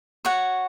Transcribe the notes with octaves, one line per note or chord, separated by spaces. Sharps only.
F#4 C#5 F#5